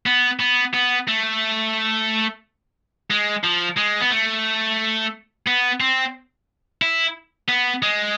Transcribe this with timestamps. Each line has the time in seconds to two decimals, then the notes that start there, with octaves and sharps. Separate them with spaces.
0.06 B3
0.40 B3
0.74 B3
1.08 A3
3.10 G#3
3.44 F3
3.77 G#3
4.01 B3
4.11 A3
5.47 B3
5.80 C4
6.82 E4
7.49 B3
7.82 G#3